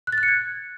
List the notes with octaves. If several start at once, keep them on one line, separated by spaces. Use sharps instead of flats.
F#6
A6
F#6
C#7
G#6